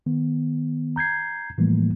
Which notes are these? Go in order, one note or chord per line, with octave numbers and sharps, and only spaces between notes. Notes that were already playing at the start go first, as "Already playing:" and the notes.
D#3 B3
A#5 G6 G#6 C7
A2 E3 F3 G3 A3 A#3